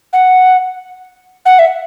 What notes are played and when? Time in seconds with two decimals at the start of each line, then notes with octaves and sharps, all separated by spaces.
0.13 F#5
1.46 F#5
1.59 E5